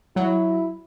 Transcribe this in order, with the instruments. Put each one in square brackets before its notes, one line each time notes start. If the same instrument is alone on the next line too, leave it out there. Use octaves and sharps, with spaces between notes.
[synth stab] F#3 [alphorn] E4